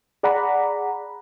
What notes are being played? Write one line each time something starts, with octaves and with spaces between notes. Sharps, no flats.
G#4 D5 F#5 A#5 B5